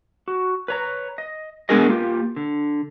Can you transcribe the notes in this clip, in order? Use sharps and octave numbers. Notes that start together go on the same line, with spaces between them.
F#4
B4 C#5 A#5
D#5
G#3 B3 D4 G#4 A#4 D#5
A#3 F4 G4
D3